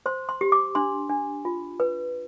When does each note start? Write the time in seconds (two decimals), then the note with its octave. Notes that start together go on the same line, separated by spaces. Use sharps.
0.06 C5 C6
0.29 C6
0.41 G4
0.52 D6
0.75 D4 C6
1.09 D4
1.45 F4
1.80 B4